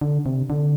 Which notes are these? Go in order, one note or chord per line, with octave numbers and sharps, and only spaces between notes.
D3
C3
D3